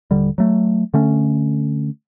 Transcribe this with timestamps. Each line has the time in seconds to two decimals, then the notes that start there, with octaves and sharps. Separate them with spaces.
0.11 D#1 D3 G3
0.38 F#3 A3
0.94 D3 A3 C#4